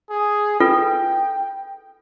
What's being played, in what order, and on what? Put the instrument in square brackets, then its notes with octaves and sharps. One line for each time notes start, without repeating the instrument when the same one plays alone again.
[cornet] G#4
[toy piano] F4 A4 B4 [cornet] G5